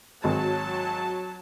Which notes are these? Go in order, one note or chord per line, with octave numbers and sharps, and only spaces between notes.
G#1 F#3 A5